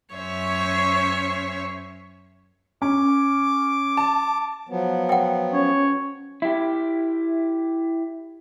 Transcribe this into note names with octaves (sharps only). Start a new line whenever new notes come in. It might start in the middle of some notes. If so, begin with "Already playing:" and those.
F#2 C#4 C5 C#5 E5 C#6
C#4 D6
A5
F3 F#3 B3
F#5 G5
C#4 C#5
E4 G4